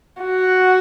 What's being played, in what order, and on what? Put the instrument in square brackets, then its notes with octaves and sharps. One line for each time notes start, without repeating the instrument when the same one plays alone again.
[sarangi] F#4